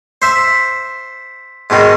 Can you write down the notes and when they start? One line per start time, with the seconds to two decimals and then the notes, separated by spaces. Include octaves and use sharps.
0.22 C5 E5
1.70 G#2 B2 D#3